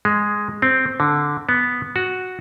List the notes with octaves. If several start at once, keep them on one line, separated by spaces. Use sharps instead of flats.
G#3
C4
D3
B3
F#4